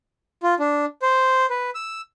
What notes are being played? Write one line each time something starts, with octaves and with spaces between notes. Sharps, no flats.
F4
D4
C5
B4
E6